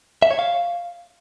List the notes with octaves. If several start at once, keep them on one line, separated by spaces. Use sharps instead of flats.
E5
C#5
F5